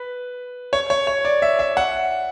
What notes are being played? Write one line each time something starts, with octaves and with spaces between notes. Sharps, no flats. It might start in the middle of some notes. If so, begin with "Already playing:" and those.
Already playing: B4
C#5
C#5
C#5
D5
E5
E5
F#5